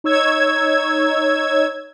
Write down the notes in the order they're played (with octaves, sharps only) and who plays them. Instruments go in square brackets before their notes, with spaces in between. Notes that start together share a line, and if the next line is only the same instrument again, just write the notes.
[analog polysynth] D#4 C#5 E6 G#6